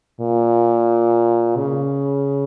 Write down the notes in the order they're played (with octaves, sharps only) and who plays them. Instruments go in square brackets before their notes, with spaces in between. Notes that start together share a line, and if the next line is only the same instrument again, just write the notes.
[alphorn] A#2
C#3